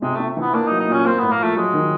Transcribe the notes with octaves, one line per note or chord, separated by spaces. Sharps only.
C3 G#3
C3 A3
E3 B3
A#3 D4
D#4
F#3
D#4
A#2 C#4
A#3 C4
A2 B3
A#3
F3 A3
F#3 G#3
D#3